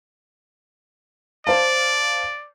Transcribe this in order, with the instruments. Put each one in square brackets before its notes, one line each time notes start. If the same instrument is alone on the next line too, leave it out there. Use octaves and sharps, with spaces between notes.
[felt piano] C5 F5 A5 [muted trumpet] D5